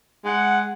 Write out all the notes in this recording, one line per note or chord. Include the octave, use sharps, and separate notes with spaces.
G#3 F#5